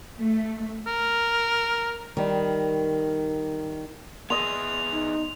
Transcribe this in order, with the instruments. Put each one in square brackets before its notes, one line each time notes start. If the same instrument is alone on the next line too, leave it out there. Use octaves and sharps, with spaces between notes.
[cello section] A3
[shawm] A#4
[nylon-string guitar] D#3 G3
[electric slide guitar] B3 G#4 [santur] D#5 C6 [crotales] F7
[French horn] D#4